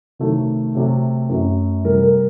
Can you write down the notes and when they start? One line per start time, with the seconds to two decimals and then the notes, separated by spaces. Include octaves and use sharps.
0.19 C3 D#3 F#3 A3
0.75 C3 F#3 A3
1.29 F#2 F#3 A3
1.84 C3 G3 A#4
2.03 A#4